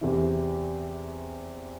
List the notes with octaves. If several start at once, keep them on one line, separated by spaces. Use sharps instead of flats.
E2 C3 E3